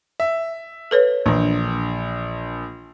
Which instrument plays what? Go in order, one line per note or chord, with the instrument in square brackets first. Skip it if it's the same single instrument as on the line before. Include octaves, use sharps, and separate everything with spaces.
[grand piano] E5
[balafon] A4 B4 C#5
[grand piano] A#1 [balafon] E3 D4